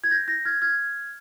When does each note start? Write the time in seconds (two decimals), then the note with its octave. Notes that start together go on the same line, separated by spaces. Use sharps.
0.04 G#6
0.11 G6 A#6
0.28 G6 A#6
0.45 F6 G#6
0.62 F6 G#6